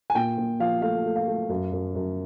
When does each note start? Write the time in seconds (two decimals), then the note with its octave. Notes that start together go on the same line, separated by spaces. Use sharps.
0.10 G#5
0.15 A#2 G5
0.38 A#2
0.60 F3 F5
0.82 A3 F5
1.05 A3
1.16 F5
1.27 A3
1.49 F#2
1.72 F#2
1.95 F#2